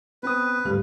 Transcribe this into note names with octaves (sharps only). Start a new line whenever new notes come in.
B3 C4 B4 D#6
D2 G#2 G3 G4